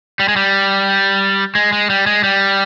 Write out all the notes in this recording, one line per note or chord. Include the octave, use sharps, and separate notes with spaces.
G3
G#3
G3
G#3
G#3
G3
G#3
G3